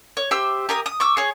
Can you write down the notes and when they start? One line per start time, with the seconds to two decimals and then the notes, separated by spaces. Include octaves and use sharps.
0.17 C#5
0.31 G4 C5 E5 E6
0.69 G4 A#4 G#5 D#6
0.86 D#6
1.00 C#6 D6 E6
1.17 G#4 C#5